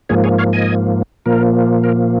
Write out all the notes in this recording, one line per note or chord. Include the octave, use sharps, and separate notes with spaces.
G#2 F3 A#3 G#4 C#5
G#4 C#5
C#5 F5
D#5 G#5
A#2 F3 A#3 A#4
A#4